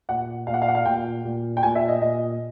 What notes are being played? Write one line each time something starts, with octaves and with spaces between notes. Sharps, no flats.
A#2 F#5
A#2 F5
F#5
F5
F#5
F5
A#2 G5
A#2
G5
A#2 G#5
E5
D#5
A#2 D#5